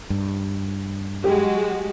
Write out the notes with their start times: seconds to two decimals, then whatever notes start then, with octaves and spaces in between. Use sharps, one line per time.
0.10 G2
1.24 F#3 G#3 F#4 G4